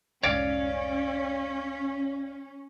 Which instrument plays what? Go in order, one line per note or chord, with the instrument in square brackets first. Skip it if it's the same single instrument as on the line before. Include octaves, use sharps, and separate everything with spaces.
[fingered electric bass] F1 C2 G#2 [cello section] C#4 [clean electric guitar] C#5 D5 F5